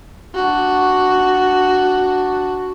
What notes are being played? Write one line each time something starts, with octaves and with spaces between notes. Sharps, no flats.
D4 F#4